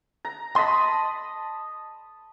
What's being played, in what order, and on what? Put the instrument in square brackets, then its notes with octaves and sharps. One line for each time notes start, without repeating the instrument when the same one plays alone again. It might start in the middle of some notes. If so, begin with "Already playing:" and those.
[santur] A#5
[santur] D#5 A5 B5 [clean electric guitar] C6